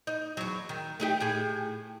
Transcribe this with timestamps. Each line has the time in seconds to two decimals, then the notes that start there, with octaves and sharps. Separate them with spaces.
0.07 D#4
0.37 E2 F#3
0.69 D#3
1.00 A3 D#4 G4
1.20 A2 G4 G#4